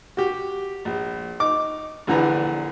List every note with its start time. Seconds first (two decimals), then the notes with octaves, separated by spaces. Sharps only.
0.17 F#4 G4
0.85 A#1
1.40 D#4 D6
2.07 A#1 D3 E3 A#5